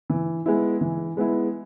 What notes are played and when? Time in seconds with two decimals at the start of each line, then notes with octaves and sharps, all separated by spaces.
0.10 E3
0.46 G#3 B3 E4
0.81 E3
1.17 G#3 B3 E4